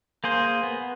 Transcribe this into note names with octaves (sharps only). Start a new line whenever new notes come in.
A#3 G#4 C5
B3